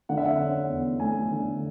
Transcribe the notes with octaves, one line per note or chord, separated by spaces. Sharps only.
D3 F#5
E5
F#5
C#4
E2
A3 G#5
D3